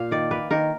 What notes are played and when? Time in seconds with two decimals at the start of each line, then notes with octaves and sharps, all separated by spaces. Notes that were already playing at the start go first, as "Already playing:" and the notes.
Already playing: A#2 F5
0.11 D#3 D5
0.31 A#3 B4
0.51 D#3 A#4